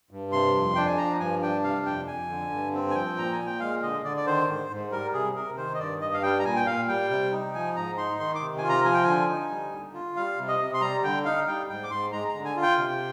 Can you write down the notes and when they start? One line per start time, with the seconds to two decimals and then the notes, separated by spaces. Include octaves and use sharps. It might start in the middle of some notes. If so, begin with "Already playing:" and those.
0.11 G2
0.32 C3 C6
0.55 F2
0.75 D4 G5
0.87 G#5
0.98 F3 A#5
1.20 G2 G#5
1.42 D4 G5
1.64 C3 F5
1.86 F2 G5
2.07 F2 G#5
2.30 D3
2.51 G2
2.74 C4
2.91 G#5
2.94 F3 G5
3.17 A#2 A#5
3.32 G#5
3.39 A#2
3.46 G5
3.60 G#3 F5
3.82 D3 D#5
4.04 D3 D5
4.17 D5
4.26 D#3 C5
4.48 G#2
4.70 G#2
4.92 G3 A#4
5.13 C3 G#4
5.35 C3 A#4
5.57 D#3 C5
5.75 D#5
5.79 G2 D5
6.01 G2 D#5
6.14 F5
6.23 G3 G5
6.39 A#5
6.45 A#2 G#5
6.56 G5
6.66 A#2 F5
6.88 G3 G5
7.10 C3
7.32 D#4
7.54 F3 G#5
7.75 G#2 A#5
7.98 D#4 C6
8.19 D#3 C6
8.35 D6
8.41 C3
8.58 F4 G#5
8.69 A#5
8.84 F3 G#5
8.94 G5
9.04 D3 G#5
9.29 D#4
9.50 G3
9.72 D3
9.94 F4
10.16 G3 F5
10.38 C3
10.48 D#5
10.60 C3
10.74 C6
10.81 G3 A#5
11.03 D3 G5
11.25 D#4 F5
11.47 G3 G5
11.69 G#2 G5
11.83 D6
11.91 G#2 C6
12.12 G#3 A#5
12.29 A#5
12.34 D3
12.45 G#5
12.56 F4
12.62 G5
12.78 C3